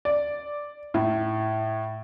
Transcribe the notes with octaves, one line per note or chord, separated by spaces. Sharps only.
D5
A2